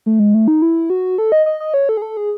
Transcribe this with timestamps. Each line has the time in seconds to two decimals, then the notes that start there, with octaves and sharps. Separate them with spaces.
0.06 A3
0.19 G#3
0.34 A3
0.48 D#4
0.62 E4
0.90 F#4
1.18 A4
1.32 D#5
1.46 D#5
1.60 D#5
1.74 C#5
1.89 A4
1.97 G#4
2.02 A4
2.17 G#4